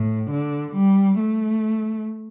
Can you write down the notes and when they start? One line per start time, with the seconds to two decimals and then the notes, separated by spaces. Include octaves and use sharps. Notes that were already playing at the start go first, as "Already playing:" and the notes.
Already playing: A2
0.31 D3
0.75 G3
1.19 A3